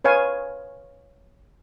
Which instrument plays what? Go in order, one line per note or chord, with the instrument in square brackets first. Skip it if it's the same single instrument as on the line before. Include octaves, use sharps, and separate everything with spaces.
[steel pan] B4 C#5 F5 G#5